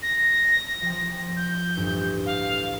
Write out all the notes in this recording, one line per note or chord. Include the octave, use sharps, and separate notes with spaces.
A#6
F3 G5
G6
A1 D2 G2
F5